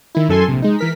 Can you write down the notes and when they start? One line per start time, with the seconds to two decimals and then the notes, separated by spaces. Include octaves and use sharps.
0.15 D#3 E4
0.29 F#2 A4 G#5 C6
0.48 A#1 C3
0.62 G#3 D#4
0.79 E3 A#4 B6